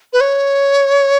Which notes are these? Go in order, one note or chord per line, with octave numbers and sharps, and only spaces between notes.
B4
C#5